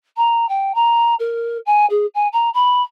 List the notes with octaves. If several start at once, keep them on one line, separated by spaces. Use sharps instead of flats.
A#5
G5
A#5
A#4
G#5
G#4
G#5
A#5
B5